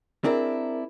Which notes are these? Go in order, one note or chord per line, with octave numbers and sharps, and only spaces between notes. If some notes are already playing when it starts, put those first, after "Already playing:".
C4 D4 E4 G#4 A#4